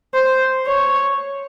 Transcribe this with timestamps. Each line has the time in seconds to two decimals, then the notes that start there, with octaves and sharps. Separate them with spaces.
0.14 C5
0.66 C#5